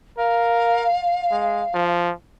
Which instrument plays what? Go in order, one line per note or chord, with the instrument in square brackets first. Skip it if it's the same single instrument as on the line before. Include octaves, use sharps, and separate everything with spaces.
[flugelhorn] A#4 [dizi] F5
[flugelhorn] G#3
F3